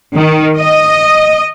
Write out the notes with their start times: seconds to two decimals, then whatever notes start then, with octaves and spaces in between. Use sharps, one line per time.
0.16 D#3
0.58 D#5